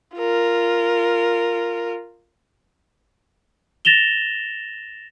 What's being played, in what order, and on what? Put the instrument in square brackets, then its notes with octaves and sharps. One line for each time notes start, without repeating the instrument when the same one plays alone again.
[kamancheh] F4 A#4
[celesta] A6 A#6 E7 F7 G7